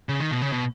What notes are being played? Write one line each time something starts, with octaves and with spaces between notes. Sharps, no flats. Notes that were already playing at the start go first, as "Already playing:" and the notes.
C#3
D#3
B2
C#3
B2